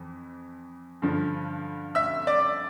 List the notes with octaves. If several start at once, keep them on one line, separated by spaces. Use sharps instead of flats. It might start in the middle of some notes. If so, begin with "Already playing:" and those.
Already playing: F2 E3
G2 D3 F3
E5 E6
D5 D6